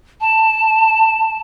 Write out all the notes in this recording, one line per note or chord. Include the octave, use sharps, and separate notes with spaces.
A5